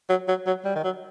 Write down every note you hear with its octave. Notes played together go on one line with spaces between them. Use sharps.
F#3
F#3
F#3
G3
D#3
F#3